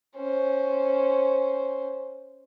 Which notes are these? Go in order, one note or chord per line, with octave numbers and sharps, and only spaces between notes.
C#4 C5